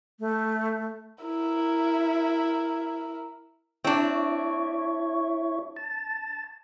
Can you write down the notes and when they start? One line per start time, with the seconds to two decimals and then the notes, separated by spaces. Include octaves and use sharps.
0.20 A3
1.24 E4 A#4
3.84 C4 D4 E4 C#5
5.76 A5